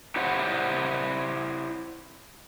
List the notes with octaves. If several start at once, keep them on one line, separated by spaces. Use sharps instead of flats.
E4 G4 C5 C#5 F#5